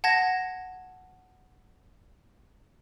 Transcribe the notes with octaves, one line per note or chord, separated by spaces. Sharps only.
F#5 A5 G#6 A#6